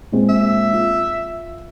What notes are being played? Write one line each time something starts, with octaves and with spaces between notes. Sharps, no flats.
A#2 G#3 C4
E5
F4